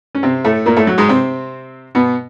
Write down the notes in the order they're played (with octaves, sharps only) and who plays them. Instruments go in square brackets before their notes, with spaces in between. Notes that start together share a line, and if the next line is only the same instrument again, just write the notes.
[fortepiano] C#4
C3 C4
A2 A3
A#2 A#3
A2 A3
F#3
G#2 G#3
C3 C4
B2 B3